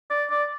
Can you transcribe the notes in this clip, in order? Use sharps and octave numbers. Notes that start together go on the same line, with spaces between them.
D5
D5